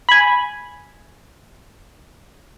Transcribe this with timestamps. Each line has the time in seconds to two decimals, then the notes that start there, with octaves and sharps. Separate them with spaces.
0.09 G#5 B5